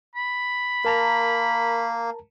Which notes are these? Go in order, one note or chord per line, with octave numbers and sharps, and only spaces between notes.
B5
A#3 A#4 A5 A#5